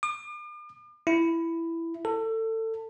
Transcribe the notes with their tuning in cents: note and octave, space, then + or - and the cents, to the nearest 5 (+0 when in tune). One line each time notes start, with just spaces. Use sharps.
D6 +45
E4 +10
A4 +25